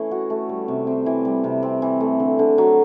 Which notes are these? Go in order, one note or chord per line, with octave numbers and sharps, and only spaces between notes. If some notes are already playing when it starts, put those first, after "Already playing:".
Already playing: E3 A3 C#4
F#4
A3
G3
C3
C4
E3
G3
C3
C4
E3
A3
D3
D3
F#3